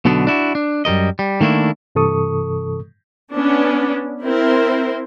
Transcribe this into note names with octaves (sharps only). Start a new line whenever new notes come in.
B1 B2 D3 B3 D4
D4 E4 F#4
D4
F#2 G3 A#4 D#5
G3
D#3 A3 A#3 D4 E4
G2 C3 E3 A4 C#6 D#6
B3 C#4 D4
C4 E4 A#4 C5